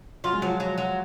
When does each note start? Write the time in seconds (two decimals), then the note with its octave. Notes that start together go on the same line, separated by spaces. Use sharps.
0.24 F#3 F4
0.33 G#3
0.42 F3 F#3
0.60 F#3
0.78 F#3